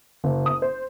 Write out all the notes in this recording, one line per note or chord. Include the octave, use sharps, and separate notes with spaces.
F#1
D#6
C5